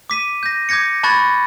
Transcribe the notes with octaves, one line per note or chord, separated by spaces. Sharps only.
D6 B6 D#7
G6 A#6
D6 G6 G#6 A#6 C#7
A5 B5 C#6 F#6 G#6 A6